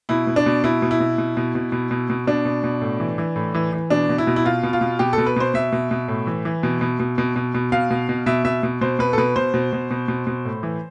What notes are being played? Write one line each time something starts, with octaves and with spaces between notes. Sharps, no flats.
B2 E4
B2
D4
B2
B2 E4
B2
E4
B2
B2
B2
B2
B2
B2
B2
B2 D4
B2
B2
A2
E3
E3
A2
E3
E3
B2 D4
B2
E4
B2
E4
B2 F4
B2
F4
B2
B2 G4
B2 A4
B4
B2 C5
B2 E5
B2
B2
A2
E3
E3
B2
B2
B2
B2
B2
B2
B2 F5
B2
B2
B2 E5
B2 E5
B2
B2 C5
B2 B4
A4
B2 B4
B2 C5
B2
B2
B2
B2
B2
A2
E3